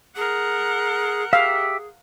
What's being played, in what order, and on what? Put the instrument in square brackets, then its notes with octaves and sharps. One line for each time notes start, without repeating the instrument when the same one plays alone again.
[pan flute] G#4 [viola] A#4 F#5
[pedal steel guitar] G4 E5 [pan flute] G#4 [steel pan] F5